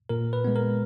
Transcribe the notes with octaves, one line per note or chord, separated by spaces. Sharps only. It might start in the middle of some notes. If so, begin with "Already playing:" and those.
A#2 A#4
B4
G#3 B3
A#4